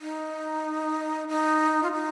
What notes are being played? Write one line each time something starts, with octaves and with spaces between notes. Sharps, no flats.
D#4
D#4
F4
D#4